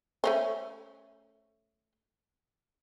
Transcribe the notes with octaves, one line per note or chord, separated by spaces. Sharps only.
A3 C#4 C5